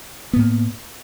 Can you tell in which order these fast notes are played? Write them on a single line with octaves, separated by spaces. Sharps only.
B3 A2 A#3